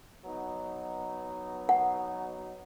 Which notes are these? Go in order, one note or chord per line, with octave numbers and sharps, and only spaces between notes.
F#3 B3 D#4
F#5